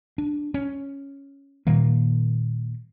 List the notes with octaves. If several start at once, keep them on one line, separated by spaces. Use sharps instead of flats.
D4
C#4
A#2 D#3 G3 A#3